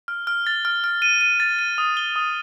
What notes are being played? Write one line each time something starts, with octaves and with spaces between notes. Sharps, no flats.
F6
F6
A6
F6
F6
D#7
D#7
A6
D#7
D#6
G7
D#6